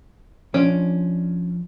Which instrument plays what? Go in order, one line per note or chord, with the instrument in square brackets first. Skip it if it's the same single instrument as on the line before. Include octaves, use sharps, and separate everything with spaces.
[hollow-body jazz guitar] F3 D4 D5 [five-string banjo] C#4